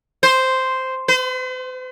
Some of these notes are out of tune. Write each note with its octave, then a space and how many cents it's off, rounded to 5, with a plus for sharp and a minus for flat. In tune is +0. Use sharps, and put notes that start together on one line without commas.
C5 -5
C5 -45